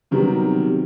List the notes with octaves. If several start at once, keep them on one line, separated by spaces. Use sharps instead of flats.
C3 D#3 F#3 G3 B3